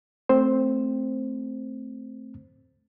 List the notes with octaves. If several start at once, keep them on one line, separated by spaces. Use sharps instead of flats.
A3 C4 C5